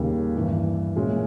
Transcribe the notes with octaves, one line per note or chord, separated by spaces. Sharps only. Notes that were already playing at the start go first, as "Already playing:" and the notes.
Already playing: D#2 C#3 G3 A#3
G2 E3 G3
A#2 G#3 C#4 E4